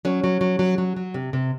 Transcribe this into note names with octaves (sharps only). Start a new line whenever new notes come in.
F#3 C#4
F#3
F#3
F#3
F#3
F#3
C3
C3